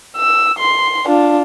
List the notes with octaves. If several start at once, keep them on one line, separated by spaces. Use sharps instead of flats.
E6
C6
D4 F4